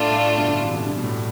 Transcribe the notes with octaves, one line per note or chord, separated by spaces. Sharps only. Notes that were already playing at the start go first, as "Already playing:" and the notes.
Already playing: A2 A3 D4 F4
A2
G2 B2
B2 D3
C3 E3
B2 D3
G2
B2
A2